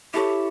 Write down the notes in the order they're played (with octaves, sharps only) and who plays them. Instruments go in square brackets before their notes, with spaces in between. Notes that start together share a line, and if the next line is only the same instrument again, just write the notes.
[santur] E4 A4 C#5 E5 [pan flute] G4